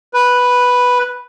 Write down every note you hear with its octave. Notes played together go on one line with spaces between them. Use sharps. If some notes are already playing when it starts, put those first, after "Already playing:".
B4